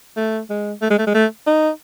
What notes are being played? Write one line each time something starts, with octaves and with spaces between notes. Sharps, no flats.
A3
G#3
A3
G#3
A3
G#3
A3
D#4